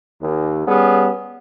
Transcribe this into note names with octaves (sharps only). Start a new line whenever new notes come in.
D#2
G3 B3 C#4 G#4